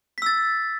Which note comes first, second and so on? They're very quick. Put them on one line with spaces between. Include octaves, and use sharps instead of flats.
B6 E6 A6